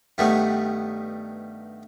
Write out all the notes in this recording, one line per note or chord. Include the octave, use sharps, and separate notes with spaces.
G2 D#3 G3 A3 B3